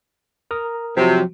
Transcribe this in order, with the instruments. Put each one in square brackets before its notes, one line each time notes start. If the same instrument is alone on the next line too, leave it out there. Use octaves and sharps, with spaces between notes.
[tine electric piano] A#4 A#5 D#6
[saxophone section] C3 [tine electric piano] F3 F#3 F#4